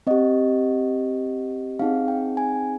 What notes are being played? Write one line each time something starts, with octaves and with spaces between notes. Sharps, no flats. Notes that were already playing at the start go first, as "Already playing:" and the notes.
C4 G4 D#5
C4 D#4 G#4 F5
G5
G#5